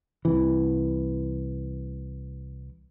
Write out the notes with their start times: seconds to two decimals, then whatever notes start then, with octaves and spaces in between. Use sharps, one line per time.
0.25 C2 C3 E3